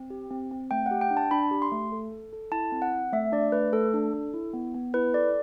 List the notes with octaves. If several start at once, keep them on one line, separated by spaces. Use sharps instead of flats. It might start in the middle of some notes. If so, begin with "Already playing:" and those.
Already playing: C4
G4
C4
C4
A3 G5
F#5
G4
G5
D4
A5
D4 B5
G4
C6
A3
A4
A4
A4
E4 A5
C4
F#5
C4
A3 E5
D4 D5
A3 B4
A3 A4
D4
A4
E4
B3
B3
E4 B4
A4 D5